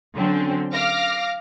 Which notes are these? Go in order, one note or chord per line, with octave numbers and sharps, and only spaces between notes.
D3 F#3 C4 C#4
F5 D6 F6 A#6